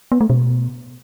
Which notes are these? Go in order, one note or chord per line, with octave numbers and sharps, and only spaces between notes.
B3
A3
B2